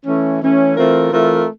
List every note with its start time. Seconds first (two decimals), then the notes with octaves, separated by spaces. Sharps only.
0.04 E3 A3 C#4
0.40 E3 A3 C#4
0.75 E3 A3 C4 F4 A#4
1.10 E3 A3 C4 F4 A#4